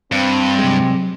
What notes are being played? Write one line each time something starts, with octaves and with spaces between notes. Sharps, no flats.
G2 C4
C3 F#3 G#3